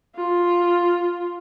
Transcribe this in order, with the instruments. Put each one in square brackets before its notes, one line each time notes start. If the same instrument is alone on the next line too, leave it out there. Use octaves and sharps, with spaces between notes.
[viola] F4